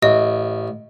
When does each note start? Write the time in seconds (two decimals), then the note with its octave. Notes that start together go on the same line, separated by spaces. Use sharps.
0.03 A1 D#5